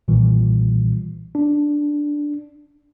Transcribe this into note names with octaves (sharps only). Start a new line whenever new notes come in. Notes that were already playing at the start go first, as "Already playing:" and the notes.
B1 A#2 D#3 E3 G3
D4